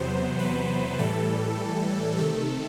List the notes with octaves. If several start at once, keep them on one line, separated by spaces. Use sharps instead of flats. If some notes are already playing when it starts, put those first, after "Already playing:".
Already playing: E2 C3 F#3 B3 C5
B4
A2 E3 G3 A4
C3 D#3 A3 A4